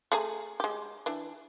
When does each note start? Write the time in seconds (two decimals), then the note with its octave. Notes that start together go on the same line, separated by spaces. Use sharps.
0.12 A3 G#4 A#5
0.60 G#3 G4
1.06 E3 D4